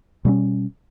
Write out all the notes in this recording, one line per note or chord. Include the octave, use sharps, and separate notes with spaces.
B2 G3 B3 C#4